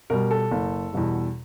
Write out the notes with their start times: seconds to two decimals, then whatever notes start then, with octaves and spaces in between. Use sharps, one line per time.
0.10 B2 G3 A#4
0.31 A4
0.51 F#1
0.93 E2 B2 G3